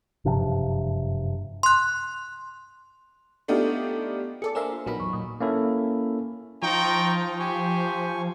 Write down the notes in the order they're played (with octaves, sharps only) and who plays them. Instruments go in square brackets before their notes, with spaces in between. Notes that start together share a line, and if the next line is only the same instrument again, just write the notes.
[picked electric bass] F#1 G2 C3 F3
[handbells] C6 F#6
[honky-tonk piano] A3 B3 D4 D#4 F4 G4
[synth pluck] G#4 A4 D5 [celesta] D6 C#7
[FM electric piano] A#3 D4 E5 [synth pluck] A#4 C6 E7 [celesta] C5 G#5
[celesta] F4 [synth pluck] C6
[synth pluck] A#1 B3 A#4 [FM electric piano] F#3 D#4 B5
[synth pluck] E2 [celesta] C#6
[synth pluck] A#2 [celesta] D#6
[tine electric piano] A#3 C#4 E4 A4
[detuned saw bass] F3 [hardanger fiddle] D#4 F4 [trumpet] G5 [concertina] A#5 C#6
[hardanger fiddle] G4 [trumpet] C5 [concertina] G#5 C#6